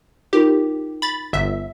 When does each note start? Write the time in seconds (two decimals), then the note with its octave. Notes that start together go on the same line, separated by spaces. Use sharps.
0.33 D#4 F4 G4 A#4
1.02 B5 A6
1.33 G1 E5